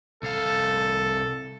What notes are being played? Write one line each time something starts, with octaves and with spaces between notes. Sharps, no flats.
C2 A4 F5